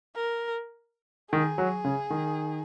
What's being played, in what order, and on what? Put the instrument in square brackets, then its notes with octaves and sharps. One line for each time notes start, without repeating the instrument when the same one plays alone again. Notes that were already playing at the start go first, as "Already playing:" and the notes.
[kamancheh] A#4
[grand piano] D#3 [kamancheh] G#4
[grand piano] F#3
C#3
D#3